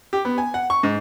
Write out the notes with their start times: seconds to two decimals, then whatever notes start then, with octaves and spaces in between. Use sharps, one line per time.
0.13 G4
0.25 B3
0.38 G#5
0.54 F#5
0.70 C#6
0.83 G#2